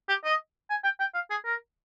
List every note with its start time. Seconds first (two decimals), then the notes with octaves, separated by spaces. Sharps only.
0.09 G4
0.25 D#5
0.70 G#5
0.84 G5
1.00 G5
1.14 F5
1.30 G#4
1.45 A#4